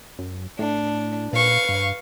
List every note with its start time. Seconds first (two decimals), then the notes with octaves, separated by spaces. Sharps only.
0.19 F#2
0.59 A2 D4
1.33 A#2 B4 F5 C#6
1.69 G2